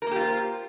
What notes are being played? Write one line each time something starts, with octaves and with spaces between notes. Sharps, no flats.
A#3 F4 G4 A#4 C5